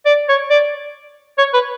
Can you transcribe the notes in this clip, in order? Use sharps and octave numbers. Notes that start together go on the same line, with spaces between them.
D5
C#5
D5
C#5
B4